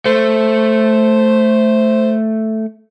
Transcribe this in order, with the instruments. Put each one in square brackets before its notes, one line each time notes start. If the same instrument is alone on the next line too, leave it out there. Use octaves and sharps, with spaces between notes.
[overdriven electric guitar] A3 [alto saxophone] C5